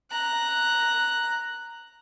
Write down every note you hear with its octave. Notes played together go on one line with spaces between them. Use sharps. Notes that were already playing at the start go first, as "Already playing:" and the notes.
A#5 F#6